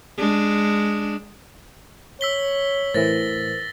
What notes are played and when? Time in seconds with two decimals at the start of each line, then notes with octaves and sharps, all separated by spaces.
0.18 G#3 D4
2.21 C#5 E6 B6 G7
2.94 A2 E3 A#4 C5 A6 A#6